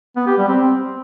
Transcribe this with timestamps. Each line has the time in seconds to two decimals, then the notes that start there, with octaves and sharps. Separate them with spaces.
0.16 B3
0.27 G4
0.38 G3
0.48 C4